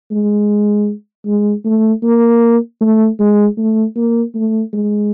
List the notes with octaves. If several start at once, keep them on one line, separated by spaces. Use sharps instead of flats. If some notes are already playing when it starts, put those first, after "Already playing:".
G#3
G#3
A3
A#3
A3
G#3
A3
A#3
A3
G#3